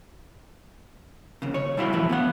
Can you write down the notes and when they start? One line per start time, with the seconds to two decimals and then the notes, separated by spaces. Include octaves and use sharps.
1.42 D#2 C#3
1.54 C#5
1.77 B2 G3 E4 E5 F5 B5
1.93 F2 E3 A3 B4 E5
2.09 B3 F5 F#5